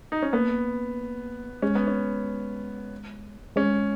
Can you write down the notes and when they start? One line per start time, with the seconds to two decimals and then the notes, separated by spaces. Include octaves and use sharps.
0.12 D#4
0.22 C#4
0.33 A#3 B3
1.62 G#3 C#4
1.75 B3
1.87 C#4
3.56 G#3 C#4